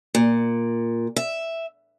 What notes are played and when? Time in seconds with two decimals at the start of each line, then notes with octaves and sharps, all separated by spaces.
0.15 A#2
1.16 E5